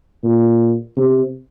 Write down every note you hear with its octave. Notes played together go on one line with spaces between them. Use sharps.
A#2
C3